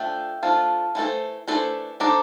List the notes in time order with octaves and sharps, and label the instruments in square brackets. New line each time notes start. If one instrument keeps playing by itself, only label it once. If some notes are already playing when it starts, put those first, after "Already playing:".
Already playing: [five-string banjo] F3 A3 D4 F4 [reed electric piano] E5 G5
[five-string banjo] F3 A3 D4 F4 [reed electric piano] F5 A5
[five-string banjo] E3 A3 D4 A4 C5
E3 A3 D4 A4 C5
[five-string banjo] A3 D4 A4 C5 [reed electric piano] A#5 D6